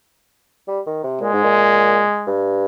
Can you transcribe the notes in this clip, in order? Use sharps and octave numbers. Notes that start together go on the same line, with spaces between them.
G3
D#3
C3
A#2 G#3
G#2
A#2
G2